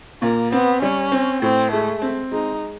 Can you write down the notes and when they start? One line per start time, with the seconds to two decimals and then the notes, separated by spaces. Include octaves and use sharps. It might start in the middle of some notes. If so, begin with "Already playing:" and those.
0.22 A#2 A#3
0.52 B3 C4
0.82 G3 C#4
1.12 C4
1.42 A2 C4
1.71 G#3 A3
2.02 C4
2.32 G#3 D#4